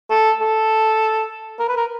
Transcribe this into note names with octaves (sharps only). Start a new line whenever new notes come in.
A4
A4
A#4
B4
A#4